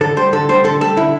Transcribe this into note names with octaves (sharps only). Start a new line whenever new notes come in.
D3 A4
G3 C5
D3 A4
G3 C5
D3 A4
G3 A4
D3 E4